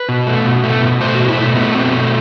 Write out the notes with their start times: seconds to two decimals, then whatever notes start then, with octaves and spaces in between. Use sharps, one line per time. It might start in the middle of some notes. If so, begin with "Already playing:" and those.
Already playing: B4
0.09 B2
0.27 A3
0.46 B2
0.64 A3
0.82 B2
1.01 A3 C5
1.15 B2 F#4
1.28 E4
1.38 A3
1.55 A3 B3
1.74 B2 C4
1.92 A3